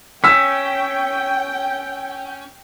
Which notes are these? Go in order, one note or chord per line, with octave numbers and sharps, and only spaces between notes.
C#4 G5 E6 B6